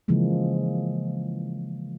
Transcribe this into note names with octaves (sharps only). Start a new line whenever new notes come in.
C#3 E3 F3 G#3 A#3